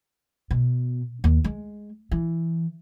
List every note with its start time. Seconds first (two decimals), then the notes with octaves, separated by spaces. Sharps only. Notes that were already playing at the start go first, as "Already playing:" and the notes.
0.51 B2
1.24 D#2
1.44 G#3
2.11 E3